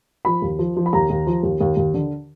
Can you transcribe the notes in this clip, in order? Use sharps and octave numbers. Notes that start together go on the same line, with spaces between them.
F3 B5
D#2
F3
F3
B5
D#2 A#5
D#2
F3
D#2
D#2
D#2
D3